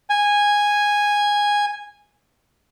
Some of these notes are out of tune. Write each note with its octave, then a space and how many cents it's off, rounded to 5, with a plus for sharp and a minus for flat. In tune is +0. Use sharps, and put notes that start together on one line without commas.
G#5 -10